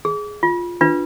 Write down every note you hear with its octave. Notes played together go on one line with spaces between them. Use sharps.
G#4
F4
D4 F4 B4